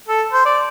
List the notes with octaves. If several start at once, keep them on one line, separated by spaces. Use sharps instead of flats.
A4
C5
D5